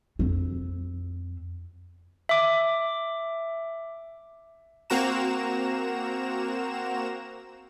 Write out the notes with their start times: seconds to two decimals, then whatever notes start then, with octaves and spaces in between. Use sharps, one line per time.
0.19 F2 C4
2.29 E5 D6
4.90 A#3 C4 F#4 A#5 E7